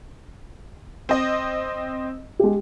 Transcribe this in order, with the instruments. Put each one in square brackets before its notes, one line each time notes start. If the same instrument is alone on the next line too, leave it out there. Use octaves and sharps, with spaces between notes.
[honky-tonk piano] C4 D#5
[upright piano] G#3 G4